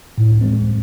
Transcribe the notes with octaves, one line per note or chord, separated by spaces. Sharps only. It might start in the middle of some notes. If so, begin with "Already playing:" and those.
A2
E3 G#3 C4